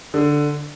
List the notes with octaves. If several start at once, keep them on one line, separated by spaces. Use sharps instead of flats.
D3